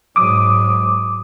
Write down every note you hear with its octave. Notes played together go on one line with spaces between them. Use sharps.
G#2 F#3 D6 D#6